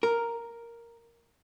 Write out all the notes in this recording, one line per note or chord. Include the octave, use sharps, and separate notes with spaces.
A#4